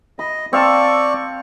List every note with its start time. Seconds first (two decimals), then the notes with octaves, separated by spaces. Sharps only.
0.19 D#5 B5
0.53 C4 D5 F5 A5 C#6